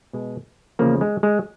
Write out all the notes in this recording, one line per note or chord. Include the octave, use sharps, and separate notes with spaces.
B2 G#3
E2 C#3 F3 A#3
G#3
G#3